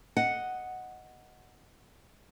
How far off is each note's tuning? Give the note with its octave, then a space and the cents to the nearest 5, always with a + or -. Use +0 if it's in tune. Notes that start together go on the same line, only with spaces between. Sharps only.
D#5 +0 F#5 +0